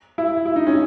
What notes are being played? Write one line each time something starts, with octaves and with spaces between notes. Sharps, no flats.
E4
E4
D#4
C#4